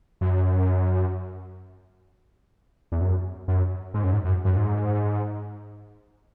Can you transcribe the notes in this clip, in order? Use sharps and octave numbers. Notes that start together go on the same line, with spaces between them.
F#2
E2
F#2
F#2
G#2
F#2
G#2
F#2
F#2
G#2